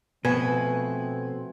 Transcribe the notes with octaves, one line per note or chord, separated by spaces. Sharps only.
B2 F3 A3 B3 C4 B4 G#5 G#6